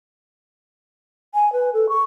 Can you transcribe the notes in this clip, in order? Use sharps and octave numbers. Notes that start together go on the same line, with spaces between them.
G#5
B4
A4
C#6